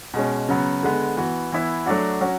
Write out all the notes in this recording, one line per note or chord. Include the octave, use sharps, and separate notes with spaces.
B2 G#3 C#4
C#3 F#3 B3
D3 G#3 B3
E3 B3 F#4
E3 B3 E4
F#3 A3 D4 F#4
F#3 C#4 F#4